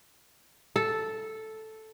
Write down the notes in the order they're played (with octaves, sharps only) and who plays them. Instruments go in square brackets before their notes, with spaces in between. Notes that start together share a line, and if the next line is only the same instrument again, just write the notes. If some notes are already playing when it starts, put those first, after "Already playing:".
[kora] A4